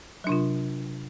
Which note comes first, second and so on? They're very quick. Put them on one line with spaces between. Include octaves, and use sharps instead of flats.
F#3 D4 C3 F4